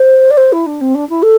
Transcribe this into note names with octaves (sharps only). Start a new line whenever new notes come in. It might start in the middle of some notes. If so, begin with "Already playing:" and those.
Already playing: C5
D5
C5
E4
D4
C4
D4
E4
A4